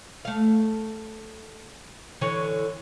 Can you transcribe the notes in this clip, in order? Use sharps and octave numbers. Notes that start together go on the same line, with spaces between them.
A3 F5
D3 E3 C#5